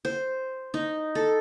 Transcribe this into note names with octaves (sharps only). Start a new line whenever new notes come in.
C5
D#4
A4